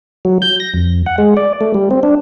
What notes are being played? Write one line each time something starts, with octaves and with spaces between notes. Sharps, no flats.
F#3
G6
A#6
F2
F#5
G#3
D5
A3
G3
C4
D4